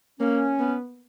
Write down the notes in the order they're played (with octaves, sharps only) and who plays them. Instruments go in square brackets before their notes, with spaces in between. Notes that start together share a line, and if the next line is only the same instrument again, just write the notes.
[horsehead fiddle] A#3 [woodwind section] C#4
[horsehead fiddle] B3